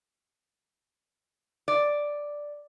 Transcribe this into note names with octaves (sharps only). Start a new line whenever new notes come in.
D5